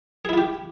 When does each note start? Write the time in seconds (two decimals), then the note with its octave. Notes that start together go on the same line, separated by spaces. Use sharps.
0.25 G#4
0.29 E4
0.33 F4
0.37 G4